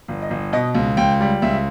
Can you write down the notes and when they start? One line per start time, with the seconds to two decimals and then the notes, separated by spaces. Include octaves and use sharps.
0.08 G1
0.22 D#5
0.30 G1
0.53 B2 D#5
0.75 C#2
0.97 C#2 G5
1.20 G3
1.42 C#2 E5